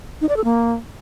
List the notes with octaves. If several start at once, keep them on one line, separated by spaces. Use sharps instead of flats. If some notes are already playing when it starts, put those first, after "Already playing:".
D#4
D5
A4
A#3